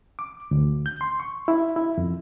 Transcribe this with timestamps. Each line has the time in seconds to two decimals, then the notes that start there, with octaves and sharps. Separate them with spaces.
0.19 D6
0.51 D2
0.86 G6
1.01 C6
1.20 C#6
1.48 E4
1.76 E4
1.98 F2